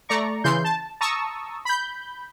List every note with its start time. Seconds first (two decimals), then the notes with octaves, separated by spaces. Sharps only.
0.09 A3 D5 A#5 C#6
0.44 C#3 E3 C6 G6
0.65 A5
1.01 A5 A#5 C#6 D#6 E6
1.65 B5 G6